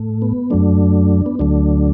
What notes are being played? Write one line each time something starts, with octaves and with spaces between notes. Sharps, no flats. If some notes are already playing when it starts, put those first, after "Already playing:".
Already playing: A2 A3
B3
F#2 F#3 A3 D4
B3
D2 D3 F#3 A3 D4